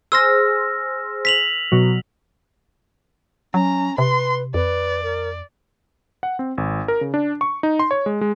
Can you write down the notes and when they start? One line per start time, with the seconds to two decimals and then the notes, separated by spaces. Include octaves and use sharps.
0.12 G#4 C5 E6 F6 A#6
1.25 B6 F7 F#7
1.72 B2 F#3
3.54 F#3 C#4 A#5
3.98 C3 B4 C6
4.54 F2 B4 D5
5.03 A#4
6.23 F#5
6.39 C4
6.58 G#1
6.88 A#4
7.01 C#3
7.14 D4
7.41 C#6
7.63 D#4
7.79 C6
7.91 C#5
8.06 G#3
8.21 G#3